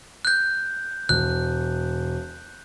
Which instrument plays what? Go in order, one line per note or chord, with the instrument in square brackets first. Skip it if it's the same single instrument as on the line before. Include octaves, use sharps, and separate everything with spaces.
[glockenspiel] F#6 G6
[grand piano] E1 [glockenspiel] F#6